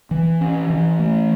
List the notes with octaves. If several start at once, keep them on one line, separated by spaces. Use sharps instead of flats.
E3
C#4
E3
A3